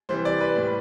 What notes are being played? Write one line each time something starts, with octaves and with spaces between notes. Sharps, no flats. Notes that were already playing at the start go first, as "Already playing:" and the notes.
C3 E3 G3 C5
D5
B4
A2 G3